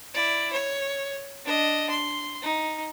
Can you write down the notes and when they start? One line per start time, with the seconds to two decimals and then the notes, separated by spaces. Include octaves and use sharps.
0.15 E4 D5
0.53 C#5
1.45 D4 D#5
1.90 C6
2.42 D#4